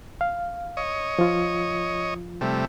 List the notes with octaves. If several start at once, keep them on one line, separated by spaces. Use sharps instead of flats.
F5
C#5 D#5
F3 F4
C3 G3 A3